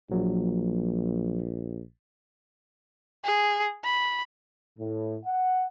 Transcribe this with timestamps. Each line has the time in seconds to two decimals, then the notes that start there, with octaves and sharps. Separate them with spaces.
0.11 A#1 F3 F#3 A#3
3.24 G#4
3.84 B5
4.79 A2
5.26 F#5